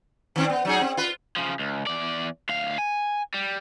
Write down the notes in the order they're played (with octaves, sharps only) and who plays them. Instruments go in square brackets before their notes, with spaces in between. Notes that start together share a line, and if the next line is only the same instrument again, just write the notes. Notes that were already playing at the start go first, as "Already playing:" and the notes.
[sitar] D#3 C4 D4
B3
F#3 D#4 G#4
C4
F4 B4
[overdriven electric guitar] C#3 F3
C#2
E2 D5
D2 F5
G#5
G3